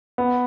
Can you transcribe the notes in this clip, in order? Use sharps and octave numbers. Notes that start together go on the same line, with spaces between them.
B3